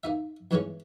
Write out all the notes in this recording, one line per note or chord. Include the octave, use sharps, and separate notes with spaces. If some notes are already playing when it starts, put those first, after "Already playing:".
A#3 D#4 E5
E2 G2 E3 G#3 A3 C#4